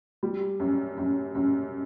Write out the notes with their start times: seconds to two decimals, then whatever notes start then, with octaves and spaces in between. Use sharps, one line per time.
0.23 G3
0.60 F#2
0.98 F#2
1.35 F#2